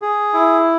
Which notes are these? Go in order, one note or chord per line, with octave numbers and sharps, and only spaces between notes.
G#4
E4